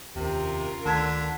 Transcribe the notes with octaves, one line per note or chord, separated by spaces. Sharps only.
F1 D#2 C3 B3 C#4 F4 A#4
D2 D3 D#3 A3 A5 G#6 B6